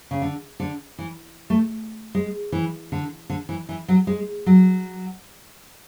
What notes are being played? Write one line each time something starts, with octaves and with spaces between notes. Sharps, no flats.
C#3
D3
D3
E3
A3
G#3
E3
D3
D3
E3
E3
F#3
G#3
F#3